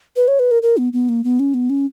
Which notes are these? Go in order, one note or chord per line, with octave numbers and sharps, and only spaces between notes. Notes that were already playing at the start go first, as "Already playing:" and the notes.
B4
C#5
B4
A#4
A#4
B3
B3
A#3
B3
C#4
B3
C#4